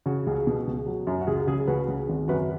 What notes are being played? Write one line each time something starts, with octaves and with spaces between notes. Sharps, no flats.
C#3 F#4
C#2
B2
C#2
F#3
F#2
F#4
C#2 G#4
C#3 G#4
C#2 F#4 B4
C#2
G#1
F#2 F#4 B4